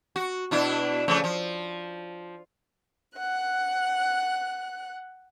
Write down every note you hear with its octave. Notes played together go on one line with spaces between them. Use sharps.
F#4
B2 D4 E4
C#3 F3 A3
F3
F#5 F#6